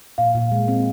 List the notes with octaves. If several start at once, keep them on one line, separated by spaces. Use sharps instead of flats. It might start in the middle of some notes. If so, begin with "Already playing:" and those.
A#2 F5
A#2
G#3
C4